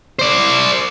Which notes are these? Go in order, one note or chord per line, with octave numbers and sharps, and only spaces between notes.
C5 D5